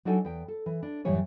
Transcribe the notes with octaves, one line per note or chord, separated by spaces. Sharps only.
F#3 D4 D#4 F#4 A4 G#5
E2 G5
A4
E3
D4
F#2 A2 E3 G3 C#5 G#5